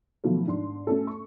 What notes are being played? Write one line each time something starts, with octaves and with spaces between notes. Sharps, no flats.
B2 D#3 F3 F#3 A3 B3
G#2 D4 C6
A3 C#4 F#4 A4
C#6